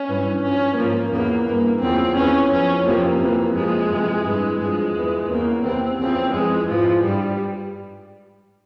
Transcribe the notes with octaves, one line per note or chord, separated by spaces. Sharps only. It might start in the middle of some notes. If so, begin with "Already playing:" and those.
Already playing: C#4
G2 E3
G2 F3 C#4
G#2 F3 A#3
E2 C#3 E3 A#3
G2 E3 A#3
E2 C#3 F3 C4
E2 C#3 E3 C#4
F2 E3 C#4
F2 C3 F3 A#3
F2 C3 E3
F2 C3 F3 G#3
F2 C3 E3
G2 E3
G2 F3 G#3
E2 E3
E2 C#3 E3 A#3
E2 C3 E3 C4
E2 C#3 F3 C4
F2 E3 G#3
G#2 E3 F3
G2 G3